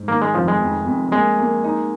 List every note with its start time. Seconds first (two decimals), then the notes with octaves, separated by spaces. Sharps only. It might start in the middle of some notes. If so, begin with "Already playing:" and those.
Already playing: G#2
0.08 D#3 A#3
0.22 G#3
0.34 F1 F3
0.48 G#3
0.60 F2
0.86 F2
1.12 G#3 A#3
1.38 A#3
1.64 D#4